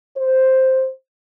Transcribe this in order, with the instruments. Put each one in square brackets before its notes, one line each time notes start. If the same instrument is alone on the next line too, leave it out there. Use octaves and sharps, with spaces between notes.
[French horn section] C5